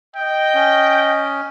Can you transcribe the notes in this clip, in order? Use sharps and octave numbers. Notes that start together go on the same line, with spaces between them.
D#5 G5
C#4